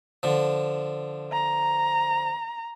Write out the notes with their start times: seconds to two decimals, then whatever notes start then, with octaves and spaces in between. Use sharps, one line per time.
0.23 D3 F3
1.31 A#5